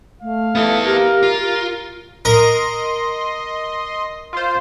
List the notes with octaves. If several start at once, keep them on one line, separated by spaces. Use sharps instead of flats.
A3 F5
G2 B3 D#4 E4 A4
G4 A#4
F4
A#4 D#5 C6
F4 C5